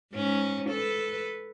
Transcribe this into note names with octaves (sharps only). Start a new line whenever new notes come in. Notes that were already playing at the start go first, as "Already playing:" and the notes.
G#2 C#4
A4 B4